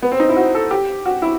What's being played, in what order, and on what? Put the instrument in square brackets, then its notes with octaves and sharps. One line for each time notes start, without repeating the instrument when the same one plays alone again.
[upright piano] B3
C4
D#4
E4
F#4
A4
G4
F#4
E4